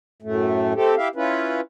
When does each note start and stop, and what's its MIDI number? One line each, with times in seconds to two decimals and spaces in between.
0.22 0.74 42
0.22 0.74 45
0.22 0.74 57
0.75 0.95 57
0.75 0.95 60
0.75 0.95 67
0.75 0.95 69
0.97 1.08 64
0.97 1.08 67
0.97 1.08 76
0.97 1.08 77
1.15 1.61 61
1.15 1.61 64
1.15 1.61 65
1.15 1.61 71